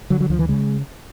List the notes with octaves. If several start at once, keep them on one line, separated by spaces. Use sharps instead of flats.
D3 F#3
F#3
D2 F3
E3
C#3 G#3